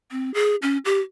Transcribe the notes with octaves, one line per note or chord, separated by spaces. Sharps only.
C4
G#4
C#4
G4